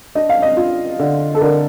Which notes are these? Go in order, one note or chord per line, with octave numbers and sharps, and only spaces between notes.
D4 D#5
F5
D#5
F4
D3
A4
D3 A#4